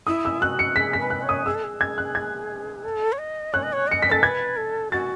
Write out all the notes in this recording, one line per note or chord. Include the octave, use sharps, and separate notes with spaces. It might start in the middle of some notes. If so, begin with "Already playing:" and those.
E4 D#6
E6
F#4 F#6
C#7
G#4 B6
B6
B4
F#6
C#5
D#6
G#4 E6
A4
G#4
G#6
F#6
G#6
A4
C#5
D#5
C#5 F#6
D#5
C#5
D#5 C#7
B6
A4 A6
B4 G#6
A4
F#4 A6